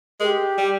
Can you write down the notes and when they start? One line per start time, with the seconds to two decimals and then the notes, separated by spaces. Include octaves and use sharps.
0.20 G#3 G4 A#4
0.58 G3